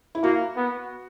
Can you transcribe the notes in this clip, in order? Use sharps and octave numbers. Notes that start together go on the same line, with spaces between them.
E4
A#3 F#4
B3